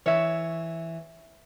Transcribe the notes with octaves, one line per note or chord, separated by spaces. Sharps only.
E3 C#5 E5